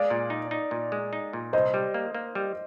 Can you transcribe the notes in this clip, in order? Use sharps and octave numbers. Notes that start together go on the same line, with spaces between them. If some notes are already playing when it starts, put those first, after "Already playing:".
Already playing: G#3 D5 F5
A#2
D#4
D#4
A#2
G#3
D#4
A#2
C2 C5 D#5
G3
A#3
A#3
G3